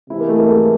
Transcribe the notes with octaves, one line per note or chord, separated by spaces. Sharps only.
C3 E3 G#3 E4
A#3
A3
A#3
A3